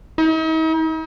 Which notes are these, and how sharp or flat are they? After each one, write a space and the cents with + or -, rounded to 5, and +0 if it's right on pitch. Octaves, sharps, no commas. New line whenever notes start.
D#4 +45